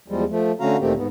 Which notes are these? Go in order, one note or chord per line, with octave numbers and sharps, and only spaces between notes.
E2 F3 G3 G#3
F3 A3
D3 A3 C#4 F#4 F5 A#5
D2 A#2 D#3 A3 C4 G4
G#2 B3